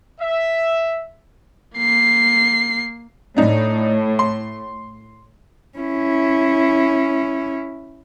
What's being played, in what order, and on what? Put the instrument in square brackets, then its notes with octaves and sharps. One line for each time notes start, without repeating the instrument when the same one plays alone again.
[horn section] E5
[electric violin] A#3 C7
[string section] A2 [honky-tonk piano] D4 D#4
[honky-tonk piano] C6
[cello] C#4 E4